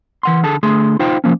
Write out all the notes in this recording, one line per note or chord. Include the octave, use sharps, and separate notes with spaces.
E3 F#5 C6
D3 G#4 A4 A5
D3 A3 G#4 C6
D#4 F4 C5 F5 G5
F3 A#3 C#4